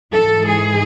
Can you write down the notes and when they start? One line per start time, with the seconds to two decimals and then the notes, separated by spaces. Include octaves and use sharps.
0.12 G#2 E3 A4
0.47 G#4